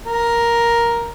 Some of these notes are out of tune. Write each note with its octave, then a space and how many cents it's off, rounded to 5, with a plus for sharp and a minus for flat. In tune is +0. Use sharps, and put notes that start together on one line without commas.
A#4 +5